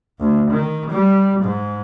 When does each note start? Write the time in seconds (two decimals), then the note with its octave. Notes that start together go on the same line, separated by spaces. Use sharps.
0.20 D2
0.50 D#3
0.90 G3
1.41 G#2